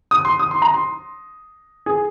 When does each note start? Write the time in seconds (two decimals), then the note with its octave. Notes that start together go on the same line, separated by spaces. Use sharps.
0.11 D#6
0.25 C6
0.39 D#6
0.51 C6
0.62 A#5
0.74 C6
1.86 G#4